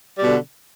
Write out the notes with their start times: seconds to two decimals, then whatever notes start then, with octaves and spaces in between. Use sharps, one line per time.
0.18 G3
0.21 B2
0.24 D3